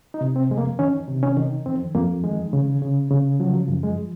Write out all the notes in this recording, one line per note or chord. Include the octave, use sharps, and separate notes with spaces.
D#4
C3
C4
F2 G#3
A#3
D#3 C#4
C3
C#4
D#3
F2 C4
F2 A#3
D#3 G#3
C#3
C#3
C#3
F3 F#3
F#2
G#3